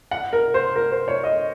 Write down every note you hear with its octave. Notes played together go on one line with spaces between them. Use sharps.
F#5
A#4
C5
A#4
C5
C#5
D#5